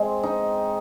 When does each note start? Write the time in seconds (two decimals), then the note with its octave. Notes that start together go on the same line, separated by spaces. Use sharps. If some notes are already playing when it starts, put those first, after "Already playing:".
Already playing: G#3 C4
0.23 D#4